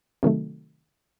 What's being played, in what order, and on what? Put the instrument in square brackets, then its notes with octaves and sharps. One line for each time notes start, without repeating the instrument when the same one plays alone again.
[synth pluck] C3 D#3 F#3 A3